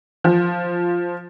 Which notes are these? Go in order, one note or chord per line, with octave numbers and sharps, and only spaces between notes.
F3